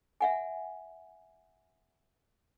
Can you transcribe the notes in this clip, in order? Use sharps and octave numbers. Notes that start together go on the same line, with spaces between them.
E5 F#5 G#5